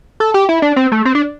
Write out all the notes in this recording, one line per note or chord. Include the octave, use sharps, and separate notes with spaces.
A4
G4
E4
D4
C4
A3
C4
D4